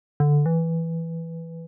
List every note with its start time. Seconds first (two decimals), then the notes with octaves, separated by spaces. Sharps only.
0.20 D3
0.46 E3